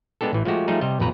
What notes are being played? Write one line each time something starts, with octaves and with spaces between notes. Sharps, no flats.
G#3 B3 D4 G4 A4
A1 E3
F3 G#3 A3 F#4 G4
F3 G3 A3 D#4 G#4
C3 G3 D#5
A1 F2 B2 B4 A#5